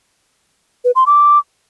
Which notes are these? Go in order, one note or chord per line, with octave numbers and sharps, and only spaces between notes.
B4
C6
D6